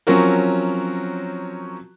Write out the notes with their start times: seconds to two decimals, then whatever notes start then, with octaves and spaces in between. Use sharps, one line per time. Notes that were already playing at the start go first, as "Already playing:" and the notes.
0.07 F3 F#3 C4 C#4 F#4 A#4